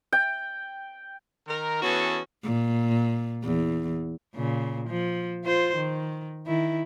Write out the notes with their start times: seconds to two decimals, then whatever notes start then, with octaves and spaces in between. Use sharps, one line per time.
0.12 G5
1.47 D#3 A#4
1.82 E3 B3 C#4 F#4 G#4 A4
2.43 A#2
3.44 E2
4.35 A#2 C#3
4.89 F3
5.45 F4 C5
5.76 D#3
6.47 D#3 E4